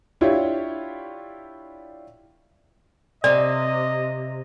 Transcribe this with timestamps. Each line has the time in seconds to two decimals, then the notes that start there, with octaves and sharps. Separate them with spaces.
0.21 D4 E4 F4 G4 C#5
3.24 C3 D5 D#5